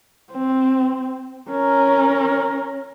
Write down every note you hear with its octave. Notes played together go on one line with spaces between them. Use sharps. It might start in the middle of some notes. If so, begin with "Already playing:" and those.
C4
C#4 A#4